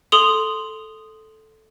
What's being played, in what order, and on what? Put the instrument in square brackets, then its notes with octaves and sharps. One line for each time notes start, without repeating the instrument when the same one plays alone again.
[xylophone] A4 C6 D#6 F7